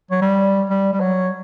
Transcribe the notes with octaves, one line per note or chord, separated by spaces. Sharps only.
F#3
G3
G3
G3
F#3